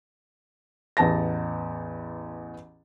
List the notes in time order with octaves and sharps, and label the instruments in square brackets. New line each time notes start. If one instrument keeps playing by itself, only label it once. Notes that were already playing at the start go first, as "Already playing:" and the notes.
[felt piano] A1 E2 A5 A#6